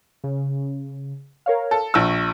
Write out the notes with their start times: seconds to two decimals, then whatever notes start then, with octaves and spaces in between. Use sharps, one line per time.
0.24 C#3
1.46 A#4 C#5 F5
1.71 A4
1.94 A#1 C#6 E6